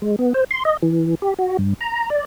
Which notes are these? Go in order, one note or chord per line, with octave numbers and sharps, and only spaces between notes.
G#3
B3
C5
C6
D#5
E3
G4
F#4
G2
A#5
D5